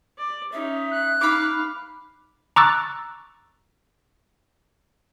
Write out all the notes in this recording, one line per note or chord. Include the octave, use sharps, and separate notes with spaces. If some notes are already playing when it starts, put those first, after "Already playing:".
D5
C#4 D#4 E5
F#6
D#4 F5 B5 D6
A#5 C#6 D6 E6 F#6 A6